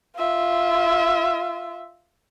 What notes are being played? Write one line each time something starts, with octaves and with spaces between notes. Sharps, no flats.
F4 E5